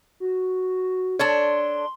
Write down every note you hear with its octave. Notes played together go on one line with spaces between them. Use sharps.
F#4
D4 A4 C#5 C6